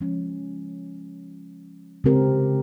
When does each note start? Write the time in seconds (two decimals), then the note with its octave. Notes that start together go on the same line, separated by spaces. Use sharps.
0.01 F3 G#3 C#4
2.04 C#3 G#3 C4 G4 A#4